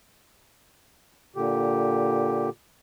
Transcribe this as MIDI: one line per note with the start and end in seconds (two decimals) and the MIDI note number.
1.36 2.49 46
1.36 2.49 50
1.36 2.49 67